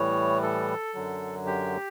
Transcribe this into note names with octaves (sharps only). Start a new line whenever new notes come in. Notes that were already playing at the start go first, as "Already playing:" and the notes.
Already playing: A2 E3 G3 C#5
A4
F#2 D3 F#3
G4